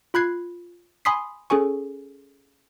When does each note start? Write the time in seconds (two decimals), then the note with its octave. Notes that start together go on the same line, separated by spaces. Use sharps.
0.14 F4 B5 F#6 G#6 C7
1.05 G#5 B5 C6 D#6 B6 C7
1.50 C#4 G#4 A4 G#5 C#6